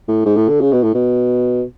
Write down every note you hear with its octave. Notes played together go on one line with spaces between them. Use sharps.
A2
G#2
A2
D3
C#3
B2
A2
B2